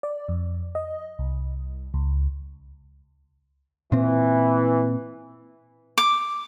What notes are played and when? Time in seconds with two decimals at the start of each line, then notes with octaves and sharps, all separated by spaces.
0.03 D5
0.28 F2
0.75 D#5
1.19 C2
1.94 C#2
3.92 A#2 E3 C4
5.98 D6